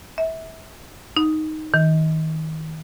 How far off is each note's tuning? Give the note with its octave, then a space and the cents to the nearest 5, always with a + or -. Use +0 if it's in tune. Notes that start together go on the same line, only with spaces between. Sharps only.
E5 -25
D#4 +5
D#3 +30